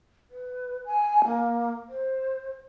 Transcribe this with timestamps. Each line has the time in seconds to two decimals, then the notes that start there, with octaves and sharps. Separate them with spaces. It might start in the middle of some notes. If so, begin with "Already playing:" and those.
0.30 B4
0.86 G#5
1.25 A#3
1.89 C5